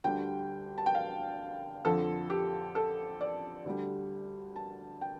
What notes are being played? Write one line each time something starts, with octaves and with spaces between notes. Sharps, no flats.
D2 D3 G3 G5
A5
G5
F5
F2 D3 F3 A4
G4
A4
D5
D2 D3 G3
A5
G5